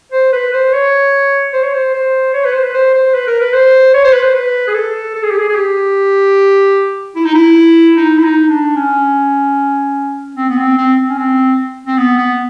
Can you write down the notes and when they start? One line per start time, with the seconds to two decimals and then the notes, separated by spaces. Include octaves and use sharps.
0.12 C5
0.33 B4
0.53 C5
0.73 C#5
1.53 C5
1.63 C#5
1.73 C5
1.94 C5
2.34 C#5
2.45 B4
2.53 C5
2.64 B4
2.74 C5
2.94 C5
3.14 B4
3.27 A#4
3.41 B4
3.54 C5
3.94 C#5
4.04 C5
4.13 B4
4.23 C5
4.35 B4
4.68 G#4
4.74 A4
5.15 A4
5.23 G#4
5.31 G4
5.38 G#4
5.49 G#4
5.56 G4
7.16 E4
7.25 D#4
7.35 E4
7.97 D#4
8.18 E4
8.24 D#4
8.49 D4
8.76 C#4
10.37 C4
10.49 B3
10.58 C4
10.78 C4
11.10 C#4
11.18 C4
11.87 C4
11.98 B3
12.18 B3